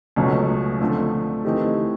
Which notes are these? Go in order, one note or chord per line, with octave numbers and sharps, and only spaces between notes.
C#2 B2 F#3 A3 C#4
D3 F3 A3 C4
E3 A3 C4 D#4 G4